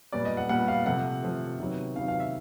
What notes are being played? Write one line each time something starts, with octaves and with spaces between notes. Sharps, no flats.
A#2 G3 B3 D5
D#5
F#5
A#2 G3 B3 F#5
F5
C3 F3 A3 F#5
C3 F3 A3
C3 D#3 F#3 B3
C3 D#3 F#3 B3 F5
F5
E5